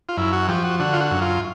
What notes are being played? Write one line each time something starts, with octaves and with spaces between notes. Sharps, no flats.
F4
F#2 E4
F#4
F3 G4
F#4
D3 F#4
F4
F#4
F#2
F4